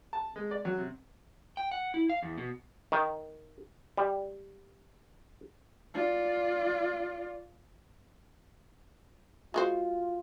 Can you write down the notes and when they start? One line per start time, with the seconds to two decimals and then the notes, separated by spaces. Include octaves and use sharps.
0.13 A5
0.36 G#3
0.51 D5
0.65 F#3
0.77 C3
1.57 G5
1.71 F#5
1.94 E4
2.10 F5
2.23 E2
2.38 B2
2.92 D#3
3.97 G3
5.94 F4 D5
9.54 G#3 F4 F#4 C5